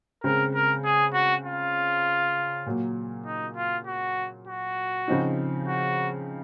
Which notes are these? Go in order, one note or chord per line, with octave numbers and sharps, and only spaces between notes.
C#3 G#3 C4 A#4
A#4
G#4
F#4
F4
A#2 F#3 A#3
D#4
F4
F#4
F#4
C#3 F3 C4 D#4
F#4